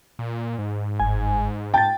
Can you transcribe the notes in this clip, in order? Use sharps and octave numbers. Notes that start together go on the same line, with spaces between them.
A#2
G#2
G1 G#5
G5 A5 A6